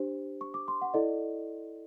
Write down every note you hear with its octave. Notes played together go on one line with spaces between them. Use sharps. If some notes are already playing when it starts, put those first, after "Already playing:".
Already playing: D4 G4 C5
C#6
D6
C6
F#5
E4 A4 D5 D#5